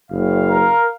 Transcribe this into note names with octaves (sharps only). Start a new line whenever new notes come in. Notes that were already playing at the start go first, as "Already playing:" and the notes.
F#1 F5
A#4